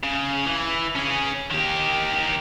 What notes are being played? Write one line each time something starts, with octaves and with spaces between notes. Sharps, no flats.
C#3
E3
C#4 G#4
D#3 G4